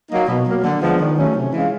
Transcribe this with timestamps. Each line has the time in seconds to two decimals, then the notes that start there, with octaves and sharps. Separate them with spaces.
0.10 F#3 A#3 D#4
0.28 B2
0.45 F#3 A#3
0.63 D3
0.81 F3 G#3 B3 D4
0.99 D#3
1.17 F#3 A3 C#4
1.35 C3
1.52 E3 G#3 C#4 F4